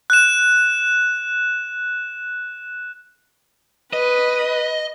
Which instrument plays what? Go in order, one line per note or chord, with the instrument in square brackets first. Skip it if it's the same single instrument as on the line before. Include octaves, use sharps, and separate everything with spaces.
[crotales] F#6 E7
[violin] B4 [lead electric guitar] D#5